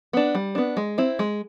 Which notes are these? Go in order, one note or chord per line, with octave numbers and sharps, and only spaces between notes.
B3 D4
G3
B3 D4
G#3
C4 E4
G#3